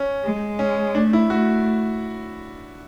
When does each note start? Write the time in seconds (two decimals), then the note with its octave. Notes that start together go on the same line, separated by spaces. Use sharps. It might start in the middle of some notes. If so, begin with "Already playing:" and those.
Already playing: C#4
0.24 G#3
0.59 C#4
0.95 A3 D4
1.13 E4
1.30 A3 F#4